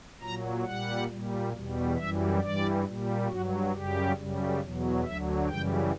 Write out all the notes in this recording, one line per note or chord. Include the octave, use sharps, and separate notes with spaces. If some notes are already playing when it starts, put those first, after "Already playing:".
A#2 F#3 A#5
A#2 G3 F#5
A#2 G3
E2 B2 G3
F#2 E3 G3 E5
G2 E3 G3 D5
A#2 G3
G2 F#3 F#4
F#2 C#3 G3 G4
F#2 C#3 G3
E2 B2 F#3
D2 D3 F#3 E5
F#2 C#3 E3 G3 G5